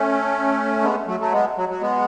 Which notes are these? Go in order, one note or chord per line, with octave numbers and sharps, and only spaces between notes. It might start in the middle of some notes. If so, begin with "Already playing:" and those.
Already playing: A3 C#4
G#3 B3
F#3 A3
F#3 A3
G#3 B3
F#3
F#3
G#3 B3